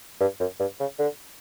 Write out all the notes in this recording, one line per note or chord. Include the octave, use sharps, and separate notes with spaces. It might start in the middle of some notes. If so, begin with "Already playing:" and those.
G2
F#2
G2
C#3
D3